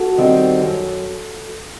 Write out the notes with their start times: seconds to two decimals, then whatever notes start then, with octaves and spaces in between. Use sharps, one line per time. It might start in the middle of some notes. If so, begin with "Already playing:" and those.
Already playing: F#4 A4
0.18 D#3 G3 C4
0.60 F#2